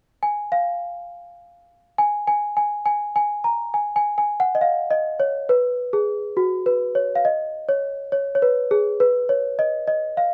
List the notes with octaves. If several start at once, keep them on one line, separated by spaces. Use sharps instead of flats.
G#5
F5
G#5
G#5
G#5
G#5
G#5
A#5
G#5
G#5
G#5
F#5
D#5
F5
D#5
C#5
B4
G#4
F#4
B4
C#5
F5
D#5
C#5
C#5
C#5
B4
G#4
B4
C#5
D#5
D#5
F5